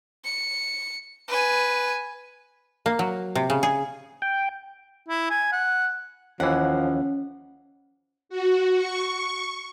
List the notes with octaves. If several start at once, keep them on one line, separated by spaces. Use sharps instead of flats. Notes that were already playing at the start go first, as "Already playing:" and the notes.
C#7
B4 G#5
A#3
F#3
C3
C#3
G#4
G5
E4
G#5
F#5
D#2 E3 F3 C#4 F#5
F#4
C#6